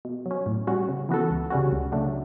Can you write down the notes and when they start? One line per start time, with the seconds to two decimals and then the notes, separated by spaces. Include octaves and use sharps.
0.05 B2
0.26 F#3
0.31 C#4
0.46 A2
0.67 G3 C#4 F#4
0.89 C#3
1.09 E3 B3 F#4 A4
1.31 C#2
1.50 C#3 G3 C#4 F#4
1.72 C#2
1.92 C#3 F#3 A3 D4